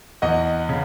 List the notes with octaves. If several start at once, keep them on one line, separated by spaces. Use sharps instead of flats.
E2 D#5 F#5
C#3